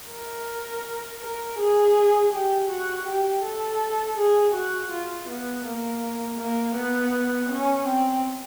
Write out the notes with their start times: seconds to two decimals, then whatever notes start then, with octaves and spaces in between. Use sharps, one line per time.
0.10 A#4
1.21 A#4
1.58 G#4
2.32 G4
2.70 F#4
3.07 G4
3.43 A4
4.17 G#4
4.54 F#4
4.91 F4
5.28 B3
5.65 A#3
6.39 A#3
6.75 B3
7.49 C#4
7.86 C4